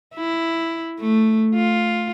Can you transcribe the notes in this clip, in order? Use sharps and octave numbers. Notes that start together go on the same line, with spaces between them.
E4
A3
F4